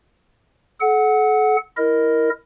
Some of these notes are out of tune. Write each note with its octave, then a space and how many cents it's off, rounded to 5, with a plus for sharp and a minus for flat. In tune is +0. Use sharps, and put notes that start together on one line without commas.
A4 -40 F#5 +0
E4 +0 A#4 +0 D#5 +0